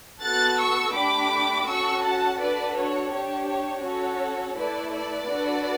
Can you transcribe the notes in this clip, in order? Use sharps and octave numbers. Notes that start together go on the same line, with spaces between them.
B3 F#4 A4 F#6 A6
C#6 E6
A3 D4 G4 B5 D6
C#4 F#4 A4 C#6 E6
F#5 A5
D4 F#4 A4 B4 D5
C#5
D4 G4 C#5
C#5
C#4 F#4 A4 C#5
A3 E4 A4 B4 D5
B4 D5
D4 F#4 A4